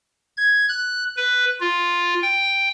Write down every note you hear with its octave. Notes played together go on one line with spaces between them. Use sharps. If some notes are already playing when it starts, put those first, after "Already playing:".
G#6
F#6
B4
F4
G5